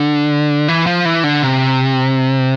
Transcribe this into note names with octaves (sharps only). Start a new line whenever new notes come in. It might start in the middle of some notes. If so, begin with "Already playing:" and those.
Already playing: D3
E3
F3
E3
D3
C3